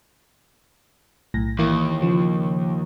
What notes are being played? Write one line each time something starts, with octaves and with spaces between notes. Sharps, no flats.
B1 A2 A#6
D#2 E3 A#3 E4
C#3 F3